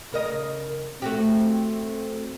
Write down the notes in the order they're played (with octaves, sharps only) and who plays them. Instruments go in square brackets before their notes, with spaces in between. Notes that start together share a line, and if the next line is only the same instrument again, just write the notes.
[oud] C#3 A#4 D#5
[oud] A3 F#4 G4 [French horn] C4